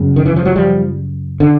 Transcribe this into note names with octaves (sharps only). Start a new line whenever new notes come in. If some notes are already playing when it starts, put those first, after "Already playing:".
Already playing: F#2 C#3
D#3
E3
F3
F#3
F3 G3
D3